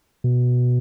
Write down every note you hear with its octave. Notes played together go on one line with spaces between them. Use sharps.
B2